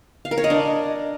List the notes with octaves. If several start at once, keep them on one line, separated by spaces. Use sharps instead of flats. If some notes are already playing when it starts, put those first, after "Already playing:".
F5
A#4
C#5
D#5
D4